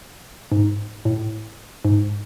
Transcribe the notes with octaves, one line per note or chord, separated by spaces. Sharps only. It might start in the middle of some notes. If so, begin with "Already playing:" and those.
G#2
A2
G#2